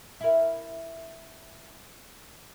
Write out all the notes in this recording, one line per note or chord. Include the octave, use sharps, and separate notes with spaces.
E4 A#4